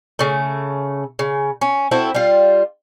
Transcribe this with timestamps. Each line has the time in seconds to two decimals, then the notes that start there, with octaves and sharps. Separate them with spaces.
0.19 C#3 A3
1.19 C#3
1.61 C#4
1.91 C4 E4 F#4 A4
2.15 G3 F4